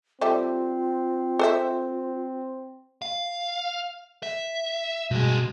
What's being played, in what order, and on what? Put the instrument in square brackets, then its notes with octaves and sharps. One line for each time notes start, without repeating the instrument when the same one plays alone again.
[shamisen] G3 A4 E5 [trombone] C4 [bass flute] F4
[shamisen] A4 C5 E5
[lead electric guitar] F5
E5
[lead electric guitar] G2 G#3 [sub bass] B2